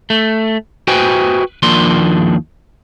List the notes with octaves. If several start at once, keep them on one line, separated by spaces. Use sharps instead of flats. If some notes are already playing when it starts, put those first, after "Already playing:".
A3
F#4 B4 C5 G5 G#5
D#2 F3 A#3 D4 C6